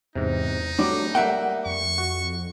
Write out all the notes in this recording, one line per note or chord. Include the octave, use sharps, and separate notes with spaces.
E2 G#2 C3 D#4
F#3 G3 A3 D4
G3 A#3 E5 F#5 G5
F2 C#6
F#4